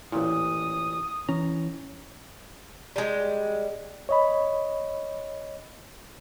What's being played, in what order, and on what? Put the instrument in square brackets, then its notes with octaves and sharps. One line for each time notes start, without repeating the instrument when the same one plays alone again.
[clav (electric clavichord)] A1 A#2 [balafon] E4 [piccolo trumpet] D#6
[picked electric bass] E3 C#4 [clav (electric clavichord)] A#5
[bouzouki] G3 G#3
[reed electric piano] C#5 D#5 B5